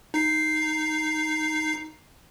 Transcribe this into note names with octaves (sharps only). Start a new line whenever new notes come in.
D#4 C7